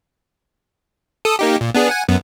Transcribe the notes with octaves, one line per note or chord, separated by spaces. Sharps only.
A4 D#6
A#3 D#4 G4
A#2
B3 D4 G#4
F#5 G#5
F#2 B3